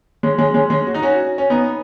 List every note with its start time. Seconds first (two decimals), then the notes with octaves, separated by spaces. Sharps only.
0.23 G#3 C#4
0.38 G#3 C#4
0.54 G#3 C#4
0.70 G#3 C#4
0.87 F#4
0.94 D#4
1.02 C#4 F#4
1.38 C#4
1.50 B3 D#4